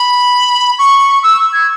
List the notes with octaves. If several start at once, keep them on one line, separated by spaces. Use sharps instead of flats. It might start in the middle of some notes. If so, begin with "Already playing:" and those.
Already playing: B5
C#6
E6
G#6